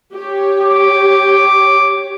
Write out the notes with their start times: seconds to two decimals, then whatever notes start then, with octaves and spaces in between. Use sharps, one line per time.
0.12 G4 C#5
0.62 D6